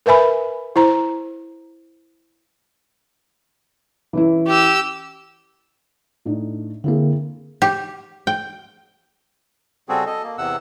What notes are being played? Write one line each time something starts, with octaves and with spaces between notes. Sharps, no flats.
A#4 B4 E5 G#5 B5
E4 C5 A#5
E3 C#4 E4
G4 E6
A2 D4 D#4
D3 A#3 C4 E4 G#4
G4
G5
C#3 G3 C4 F#4 G#4 A4
A4 D#5
A#3
E2 C3 F#5 E6